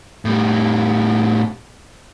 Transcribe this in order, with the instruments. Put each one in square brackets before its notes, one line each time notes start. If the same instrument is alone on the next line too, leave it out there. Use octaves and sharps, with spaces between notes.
[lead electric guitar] A2 G3